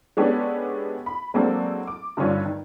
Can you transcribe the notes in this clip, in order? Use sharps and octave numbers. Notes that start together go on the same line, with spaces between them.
G#3 B3 C#4 D4 G4 A4
B5
F#3 G#3 A#3 C4 D4 A4
D6
G2 D3 D#3 C#4 F4
D#3